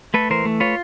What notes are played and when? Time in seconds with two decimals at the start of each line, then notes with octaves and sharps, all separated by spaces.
0.14 A3 A4 B4
0.30 E3 A#4 C5
0.45 A3
0.60 F4 B4 C#5